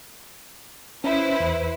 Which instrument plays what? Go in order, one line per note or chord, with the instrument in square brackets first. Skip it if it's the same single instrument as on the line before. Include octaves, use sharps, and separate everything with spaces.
[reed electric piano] C#4 [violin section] E4 B4 C5
[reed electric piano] E2